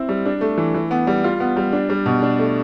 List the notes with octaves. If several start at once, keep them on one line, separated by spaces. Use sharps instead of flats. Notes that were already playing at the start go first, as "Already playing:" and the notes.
Already playing: C4 E4
G3
D4
A3
E3
E3
B3
G3
F4
B3
G3
D4
G3
B2
D4
A3